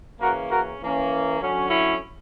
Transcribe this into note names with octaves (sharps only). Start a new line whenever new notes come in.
C#3 E3 A#3 C#4 F#4 A#4
F#4 A#4
E3 A#3 C#4
D3 F#3 C#4
C#4 E4